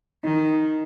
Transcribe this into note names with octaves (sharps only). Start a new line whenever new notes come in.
D#3 D#4